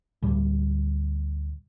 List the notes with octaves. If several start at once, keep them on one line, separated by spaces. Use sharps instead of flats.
D2 A2 G3